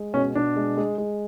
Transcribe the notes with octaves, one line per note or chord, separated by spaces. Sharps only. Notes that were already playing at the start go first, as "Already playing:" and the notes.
Already playing: G#3
B2 C#4
B2 D4
G#3
G#3
G#3